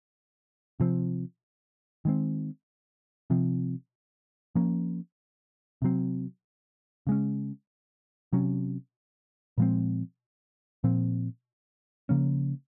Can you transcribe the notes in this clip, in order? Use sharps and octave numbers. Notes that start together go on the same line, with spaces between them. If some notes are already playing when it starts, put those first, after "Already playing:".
C3 F3 C4
D#3 G#3 C4
C3 F3 C4
F3 A#3 C#4
C3 F#3 C4
C#3 G#3 C#4
C3 F#3 C#4
A#2 F3 G#3 C4
A#2 F3 C4
C#3 F3 A#3 C#4